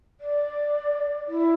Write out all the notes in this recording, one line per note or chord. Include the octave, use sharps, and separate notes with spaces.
D5
E4